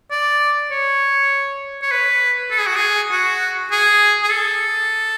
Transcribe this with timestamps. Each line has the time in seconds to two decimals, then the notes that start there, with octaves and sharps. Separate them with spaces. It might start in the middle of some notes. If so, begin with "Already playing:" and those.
0.11 D5
0.71 C#5
1.82 C#5
1.91 B4
2.51 A4
2.59 G#4
2.67 F#4
2.76 G#4
3.11 F#4
3.71 G#4
4.23 G#4
4.31 A4